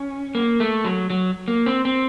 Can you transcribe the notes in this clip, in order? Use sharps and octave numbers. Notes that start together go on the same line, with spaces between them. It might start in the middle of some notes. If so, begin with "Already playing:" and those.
Already playing: C#4
A#3
A3
F#3
F#3
A#3
C4
C4